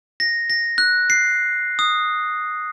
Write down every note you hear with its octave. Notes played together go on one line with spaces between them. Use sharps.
A#6
A#6
F#6
C7
D#6